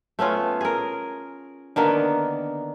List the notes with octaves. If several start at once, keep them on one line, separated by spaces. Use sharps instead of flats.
A3 B3 C#4 F4
G#4 A#4
D3 D#3 A#3 B3